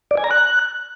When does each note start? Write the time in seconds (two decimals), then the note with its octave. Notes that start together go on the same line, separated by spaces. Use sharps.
0.11 D5
0.17 G#5
0.24 A#5
0.31 F#6